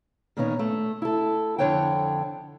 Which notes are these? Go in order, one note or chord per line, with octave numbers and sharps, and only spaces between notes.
A#2 D#3 B3 C#4 D#4
A3
E4 A4
F2 D3 G#3 C#5 F#5 G5